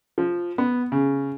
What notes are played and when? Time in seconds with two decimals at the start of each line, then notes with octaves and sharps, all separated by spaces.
0.18 F3
0.58 B3
0.92 C#3